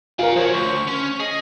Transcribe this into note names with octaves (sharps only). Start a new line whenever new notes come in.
F4 A#4 F5 G#5
F3 F#4 C5 C#5
D2 C#6
C#4
G#4 D#5